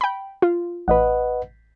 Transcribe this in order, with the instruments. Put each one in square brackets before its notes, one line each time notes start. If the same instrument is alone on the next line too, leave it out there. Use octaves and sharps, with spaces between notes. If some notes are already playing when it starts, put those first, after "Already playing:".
[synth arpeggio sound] G5 B5
F4
[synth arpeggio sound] A1 [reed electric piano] B4 D#5 F#5